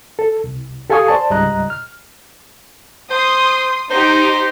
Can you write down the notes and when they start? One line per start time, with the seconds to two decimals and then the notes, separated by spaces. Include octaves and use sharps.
0.19 A4
0.44 C2
0.90 G4 A4 F5 G#5 C#6 D#6
1.08 C5 D5 A5
1.30 C#2 G#2 G3 D#5 A#5 F#6
1.70 F6
3.11 C5 C6 D#6
3.90 D#4 G4 C5